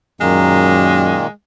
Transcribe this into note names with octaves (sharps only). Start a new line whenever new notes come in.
F#2 A#2 D#3 G#3 A#3